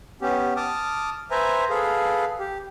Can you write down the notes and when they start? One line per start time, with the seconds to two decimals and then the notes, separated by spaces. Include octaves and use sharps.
0.22 B3 C#4 G4
0.56 A5 D6 D#6 F6
1.31 B4 C5 E5 G#5 A#5
1.70 G#4 A4 B4 F5
2.39 G4